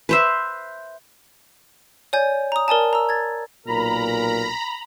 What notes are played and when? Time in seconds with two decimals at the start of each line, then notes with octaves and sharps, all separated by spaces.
0.09 B4 C5 E5
2.13 C#5 D5 G#5 G6
2.52 A#5 D#6
2.68 A#4 D5 G#5 A5
2.93 A#5 E6
3.09 G#6 A6
3.67 B1 A#2 A#4 A#5 B5